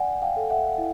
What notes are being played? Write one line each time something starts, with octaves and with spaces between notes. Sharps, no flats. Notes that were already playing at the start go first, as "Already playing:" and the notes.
Already playing: D5 F#5 G#5
F5 G5
A4
E5 F#5
E4